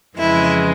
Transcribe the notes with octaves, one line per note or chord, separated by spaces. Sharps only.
F2 C#3 E3 G#3 E4